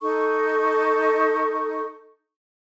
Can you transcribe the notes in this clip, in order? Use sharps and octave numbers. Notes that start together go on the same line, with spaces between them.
D#4 A4 C#6